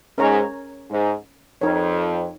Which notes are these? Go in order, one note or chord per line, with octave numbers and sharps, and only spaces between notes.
G#2 C#4 A#4 C#5 A#5 C#6
G#2
F2 D#4 A#4 C#5